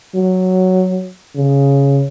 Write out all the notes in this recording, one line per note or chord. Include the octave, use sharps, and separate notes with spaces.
F#3
C#3